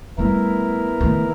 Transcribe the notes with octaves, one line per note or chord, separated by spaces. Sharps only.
G3 A3 B3 E4 A#4
D#3 A3